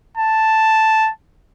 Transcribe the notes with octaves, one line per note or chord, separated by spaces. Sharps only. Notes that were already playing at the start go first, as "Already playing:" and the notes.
A5